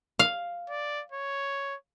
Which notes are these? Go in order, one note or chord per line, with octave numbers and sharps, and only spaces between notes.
F5
D5
C#5